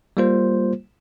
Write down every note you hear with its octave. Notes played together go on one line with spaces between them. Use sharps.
G3 A#3 F4 C5